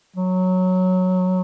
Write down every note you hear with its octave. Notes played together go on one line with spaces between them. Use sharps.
F#3